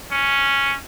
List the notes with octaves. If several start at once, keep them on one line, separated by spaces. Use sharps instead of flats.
C#4